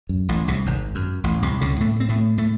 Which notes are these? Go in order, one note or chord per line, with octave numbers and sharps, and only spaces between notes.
F#2
A1 A2
C2 C3
G#1 G#2
F#2
A1 A2
C2 C3
C#2 C#3
A2 A3
C4
A2 A3
A2 A3